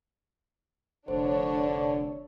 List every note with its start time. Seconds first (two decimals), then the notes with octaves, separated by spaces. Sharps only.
1.08 F1 D3 D4 C5 C#5